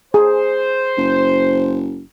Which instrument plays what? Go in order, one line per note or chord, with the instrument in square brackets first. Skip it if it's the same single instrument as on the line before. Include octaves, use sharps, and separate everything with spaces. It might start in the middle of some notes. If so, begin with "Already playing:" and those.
[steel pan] G#4 [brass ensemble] C5
[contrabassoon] F#1